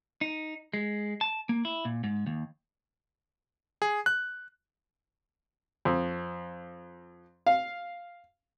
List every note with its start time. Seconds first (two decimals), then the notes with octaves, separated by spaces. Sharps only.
0.21 D#4
0.74 G#3
1.21 A5
1.49 A#3
1.65 E4
1.85 A#2
2.04 G#2
2.27 D#2
3.82 G#4
4.06 F#6
5.85 F2
7.46 F5